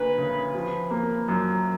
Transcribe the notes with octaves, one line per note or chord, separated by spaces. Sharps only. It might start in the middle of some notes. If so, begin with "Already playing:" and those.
Already playing: D2 A#3 B4
C#3
F3
A#3
F#2